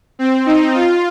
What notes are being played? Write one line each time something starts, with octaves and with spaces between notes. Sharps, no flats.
C4
D#4
F4